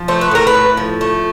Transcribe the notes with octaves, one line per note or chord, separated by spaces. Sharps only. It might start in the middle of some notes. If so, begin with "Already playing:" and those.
Already playing: F3
A3 C5
B4
A2 A#4
B4
A2
F3
A3